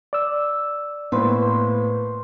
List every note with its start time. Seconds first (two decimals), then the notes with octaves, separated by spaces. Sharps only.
0.13 D5 E6
1.12 A2 A#3 B3 B4 C5